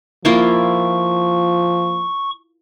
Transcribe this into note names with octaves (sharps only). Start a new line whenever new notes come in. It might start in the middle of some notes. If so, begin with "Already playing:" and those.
F3 A#3 E4 F4 C#6